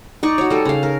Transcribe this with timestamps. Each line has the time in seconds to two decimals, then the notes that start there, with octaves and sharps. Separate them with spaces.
0.23 D#4 D5 C#6
0.38 F#4 C#5
0.50 G3 A4
0.65 C#3 F5
0.83 A#4